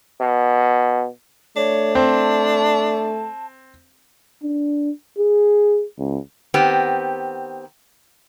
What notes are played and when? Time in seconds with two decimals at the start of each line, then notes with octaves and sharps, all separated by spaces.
0.21 B2
1.56 A3 D4 C#5
1.95 C4 A5
4.43 D4
5.19 G#4
5.98 C#2
6.54 D#3 B3 C4 G4